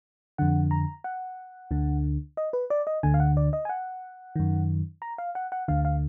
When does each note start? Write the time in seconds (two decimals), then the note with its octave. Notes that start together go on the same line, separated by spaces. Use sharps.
0.38 F2 D3 F#5
0.71 A#5
1.04 F#5
1.71 D2 D3
2.37 D#5
2.53 B4
2.70 D5
2.87 D#5
3.03 D2 D3 G#5
3.14 F5
3.20 F#5
3.37 D5
3.53 D#5
3.65 G#5
3.69 F#5
4.36 F#2 D#3
5.02 A#5
5.18 F5
5.35 F#5
5.52 F#5
5.68 D2 D3 F5
5.85 F5